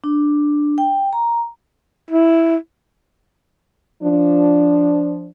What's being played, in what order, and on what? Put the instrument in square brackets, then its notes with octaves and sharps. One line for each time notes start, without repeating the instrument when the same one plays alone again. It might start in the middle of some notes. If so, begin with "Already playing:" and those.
[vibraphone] D4
G5
A#5
[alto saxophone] E4
[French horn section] F3 D4